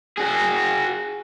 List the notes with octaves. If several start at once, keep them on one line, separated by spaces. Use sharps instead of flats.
F#4 G#4